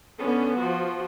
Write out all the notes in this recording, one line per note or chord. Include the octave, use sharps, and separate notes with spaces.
D3 B3 C#4
F3 F#4